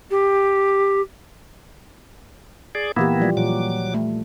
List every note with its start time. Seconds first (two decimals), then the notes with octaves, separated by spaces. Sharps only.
0.10 G4
2.75 G#4 D5
2.96 A#2 E3 A#3 B3 E4 G4
3.20 F3 G3 F4
3.37 A#2 F#3 D6
3.94 A3